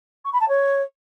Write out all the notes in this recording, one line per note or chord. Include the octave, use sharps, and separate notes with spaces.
C#6
B5
A5
C#5